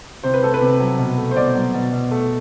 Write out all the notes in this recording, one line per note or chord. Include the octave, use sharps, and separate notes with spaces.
C3 C5
B4
A3 A4
B4
C3
F#3
B2
A3
C5
B2 D5
F#3
B2
B2
A3